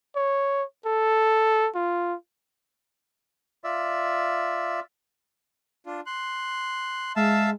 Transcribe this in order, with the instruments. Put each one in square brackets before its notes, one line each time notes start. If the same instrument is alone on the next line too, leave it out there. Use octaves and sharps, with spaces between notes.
[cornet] C#5
A4
F4
[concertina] F4 D5 E5
[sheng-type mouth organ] D4 F4
C6 F#6
[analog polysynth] G#3 [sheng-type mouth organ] E5 F5 A5